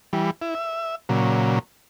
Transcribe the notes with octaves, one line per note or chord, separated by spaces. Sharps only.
E3 G3
E4
E5
A#2 C#3 F#3